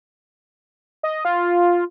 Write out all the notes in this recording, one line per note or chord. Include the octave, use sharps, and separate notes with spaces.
D#5
F4